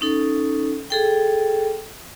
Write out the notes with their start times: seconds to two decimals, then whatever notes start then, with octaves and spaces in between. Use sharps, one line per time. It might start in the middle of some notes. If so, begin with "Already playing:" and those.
0.01 C#4 D#4 A4
0.90 G#4 A4 G5